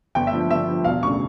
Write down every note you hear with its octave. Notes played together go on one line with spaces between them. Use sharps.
G1 G5
E5
G2 F3
G1 E5
G2 F3
E1 F5
D2 C#3 C#6